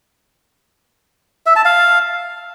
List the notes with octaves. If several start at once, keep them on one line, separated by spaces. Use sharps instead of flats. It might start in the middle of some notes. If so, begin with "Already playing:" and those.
E5
A5
F5